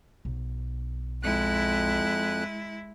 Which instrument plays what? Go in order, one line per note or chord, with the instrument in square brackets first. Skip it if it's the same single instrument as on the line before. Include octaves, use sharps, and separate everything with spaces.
[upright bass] B1
[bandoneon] F2 F#6 [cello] G#3 E4